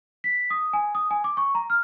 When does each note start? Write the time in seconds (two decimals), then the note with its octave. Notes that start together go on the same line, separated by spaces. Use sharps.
0.24 B6
0.50 D#6
0.73 G#5
0.95 D#6
1.11 G#5
1.24 D6
1.37 C#6
1.55 A#5
1.70 F6